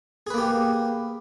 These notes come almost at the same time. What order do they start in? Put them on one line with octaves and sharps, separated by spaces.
G#4 B4 A#3 G4